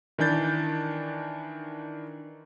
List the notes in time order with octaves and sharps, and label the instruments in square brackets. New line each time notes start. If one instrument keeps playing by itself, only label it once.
[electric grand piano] D#3 E3 D4 G6 A6